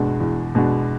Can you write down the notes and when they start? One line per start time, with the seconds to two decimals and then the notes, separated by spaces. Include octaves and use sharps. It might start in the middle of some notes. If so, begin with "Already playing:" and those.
Already playing: E2 B2 G#3 D4 F#4
0.20 E2
0.55 B2 G#3 D4 F#4